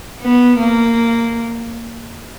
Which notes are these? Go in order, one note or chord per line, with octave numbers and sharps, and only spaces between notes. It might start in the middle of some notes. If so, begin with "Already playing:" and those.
B3
A#3